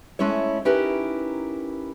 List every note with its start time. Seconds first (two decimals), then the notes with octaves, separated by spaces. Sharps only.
0.19 G#3 A3 C#4 E4 C#5
0.65 C#4 D#4 E4 G4 A#4 B4